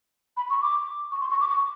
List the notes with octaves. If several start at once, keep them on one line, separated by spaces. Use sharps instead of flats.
B5
C#6
D6
C#6
C6
C#6
D6
C#6